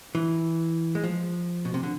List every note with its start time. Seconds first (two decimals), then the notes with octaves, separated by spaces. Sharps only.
0.15 E3
0.95 G#3
1.04 F3
1.65 B2
1.74 C3
1.83 D3